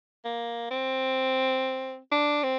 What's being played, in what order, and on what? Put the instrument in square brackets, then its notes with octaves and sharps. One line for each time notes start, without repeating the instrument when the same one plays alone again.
[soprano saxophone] A#3
C4
D4
C4